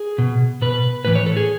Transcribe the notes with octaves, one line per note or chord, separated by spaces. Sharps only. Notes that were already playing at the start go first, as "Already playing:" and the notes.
Already playing: G#4
B2
B2 B4
A2 E3 B4
C#5
A4
G#4